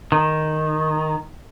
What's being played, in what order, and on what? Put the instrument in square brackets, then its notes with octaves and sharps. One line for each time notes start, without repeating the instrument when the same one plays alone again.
[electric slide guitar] D#3